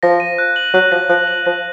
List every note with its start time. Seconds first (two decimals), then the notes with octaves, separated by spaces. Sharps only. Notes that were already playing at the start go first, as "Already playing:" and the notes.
0.03 F3 A#6
0.20 D#7
0.38 F#6
0.56 F#7
0.73 F#3 F#6
0.91 F3 A#6
1.09 F3 F#6
1.28 F#7
1.46 F3 A#6